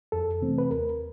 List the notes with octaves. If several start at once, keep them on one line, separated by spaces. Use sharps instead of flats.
F2 A4
C3 E3 A3 C4
B4
D#2 A#4